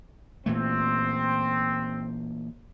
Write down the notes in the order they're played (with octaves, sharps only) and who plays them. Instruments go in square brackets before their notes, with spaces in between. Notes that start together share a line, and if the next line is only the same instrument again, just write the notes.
[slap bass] A#2 E3 A3 [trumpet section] C4